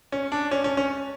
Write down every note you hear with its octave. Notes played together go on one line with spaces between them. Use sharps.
C#4
D4
C#4
C#4
C#4